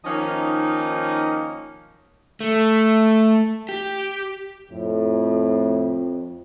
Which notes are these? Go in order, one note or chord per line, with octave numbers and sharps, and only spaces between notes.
D#3 F3 A#3 C#4 D#4 D#5
A3
G4
F2 A2